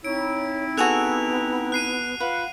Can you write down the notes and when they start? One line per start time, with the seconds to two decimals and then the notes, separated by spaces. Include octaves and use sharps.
0.05 C4 D#4 E4 C#5 D7
0.77 B3 F#4 G#4 A4 F#6 F7
1.72 F#6 C7 D#7
2.20 F4 B4 F5 F#5